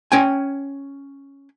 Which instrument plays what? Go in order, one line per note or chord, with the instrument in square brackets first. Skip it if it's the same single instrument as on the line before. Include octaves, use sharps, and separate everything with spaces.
[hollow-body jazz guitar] C#4 G5 G#5